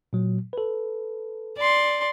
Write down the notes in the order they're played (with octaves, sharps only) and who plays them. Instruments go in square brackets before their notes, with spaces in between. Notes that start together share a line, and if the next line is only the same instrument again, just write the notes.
[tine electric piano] A#2 F#3
A4 B4
[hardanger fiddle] D5 C6